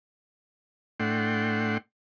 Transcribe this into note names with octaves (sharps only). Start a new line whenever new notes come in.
A2 A3 D4 F#5 G5 C6